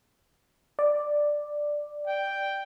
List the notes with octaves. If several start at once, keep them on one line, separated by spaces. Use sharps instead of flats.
D5
G5